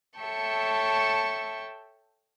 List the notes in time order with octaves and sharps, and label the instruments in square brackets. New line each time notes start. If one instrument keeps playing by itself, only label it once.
[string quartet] A4 C#5 E5 G5 A5 C#6